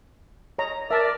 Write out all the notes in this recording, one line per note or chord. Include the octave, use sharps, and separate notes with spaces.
C#5 D#5 A#5
A#4 D5 E5 A5